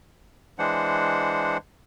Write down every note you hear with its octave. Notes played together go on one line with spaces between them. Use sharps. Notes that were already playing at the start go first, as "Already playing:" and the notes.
E3 G#3 D4 C5 F#5